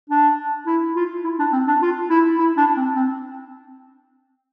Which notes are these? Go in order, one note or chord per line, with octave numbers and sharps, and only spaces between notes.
D4
E4
F4
E4
D4
C4
D4
F4
E4
E4
D4
C4
C4